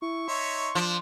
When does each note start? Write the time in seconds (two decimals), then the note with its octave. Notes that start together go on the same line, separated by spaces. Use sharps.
0.02 E4 C#6
0.28 D#4 C#5 E5 C6
0.75 F3 D4